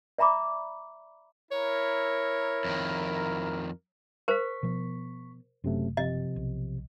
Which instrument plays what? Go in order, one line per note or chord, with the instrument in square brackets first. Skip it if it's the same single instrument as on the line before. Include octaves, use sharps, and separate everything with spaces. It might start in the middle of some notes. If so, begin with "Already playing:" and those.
[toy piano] D5 E5 A#5 B5 D6
[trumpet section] E4 A#4 [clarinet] C#5
[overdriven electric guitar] F2 D#3
[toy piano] A#4 C5 [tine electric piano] C#6 B6
[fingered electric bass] B2 F3 B3
[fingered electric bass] F#1 [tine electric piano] F#2 C3 A3
[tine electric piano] C3 F3 [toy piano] D#5
[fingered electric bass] B1